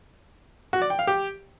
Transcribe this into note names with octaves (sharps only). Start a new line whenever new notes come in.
F#4
D5
G5
F5
G4